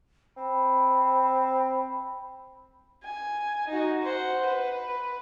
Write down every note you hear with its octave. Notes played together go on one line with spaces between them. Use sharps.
C4 B5
G#5
D#4 F#4
C5 F#5
B4